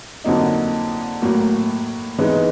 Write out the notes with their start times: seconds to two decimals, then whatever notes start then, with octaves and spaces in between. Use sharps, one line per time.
0.24 F2 D3 F#3 A#3 D#4
1.22 A2 F#3 A#3
2.19 E3 G#3 B3 D#4